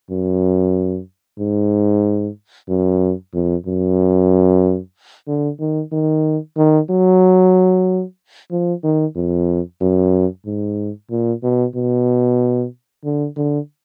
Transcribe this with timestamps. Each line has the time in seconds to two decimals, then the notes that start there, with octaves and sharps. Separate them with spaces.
0.10 F#2
1.39 G#2
2.69 F#2
3.33 F2
3.66 F#2
5.27 D3
5.60 D#3
5.92 D#3
6.57 D#3
6.90 F#3
8.51 F3
8.83 D#3
9.15 F2
9.81 F#2
10.46 G#2
11.10 A#2
11.43 B2
11.75 B2
13.04 D3
13.36 D3